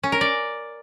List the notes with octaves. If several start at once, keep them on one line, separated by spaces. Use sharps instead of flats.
C#4
A#4
D5